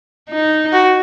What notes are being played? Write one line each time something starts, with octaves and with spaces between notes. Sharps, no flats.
D#4
F#4